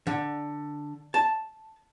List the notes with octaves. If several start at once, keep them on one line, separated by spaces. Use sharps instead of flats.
D3
A5